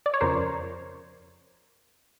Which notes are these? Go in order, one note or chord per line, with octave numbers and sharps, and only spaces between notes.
D5
C#5
F2 C#3 F3 A#4 C5